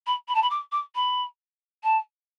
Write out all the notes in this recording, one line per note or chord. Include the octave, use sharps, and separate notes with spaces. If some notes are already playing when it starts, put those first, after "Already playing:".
B5
B5
A5
B5
D6
D6
B5
A5